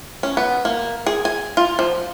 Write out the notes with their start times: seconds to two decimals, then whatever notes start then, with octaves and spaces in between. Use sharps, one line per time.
0.23 C#4
0.37 B3
0.65 A#3
1.06 G#4
1.25 G#5
1.57 F4
1.79 F3